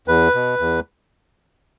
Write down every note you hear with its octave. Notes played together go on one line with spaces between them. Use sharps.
E2 B4
B2
E2